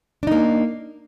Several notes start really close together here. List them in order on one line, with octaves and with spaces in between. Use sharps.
D4 D#4 A#3